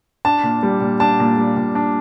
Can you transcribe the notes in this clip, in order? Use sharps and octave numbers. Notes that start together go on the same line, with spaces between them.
D4 A5
A#2
G3
A#2
D4 A5
A#2
G3
A#2
D4